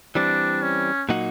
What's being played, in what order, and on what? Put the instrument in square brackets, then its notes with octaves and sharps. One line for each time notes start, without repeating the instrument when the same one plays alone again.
[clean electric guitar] E3 G3 C4 [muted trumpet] D4
[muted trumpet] C#4
[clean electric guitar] A#2 F#3 A#3 D#4 F#4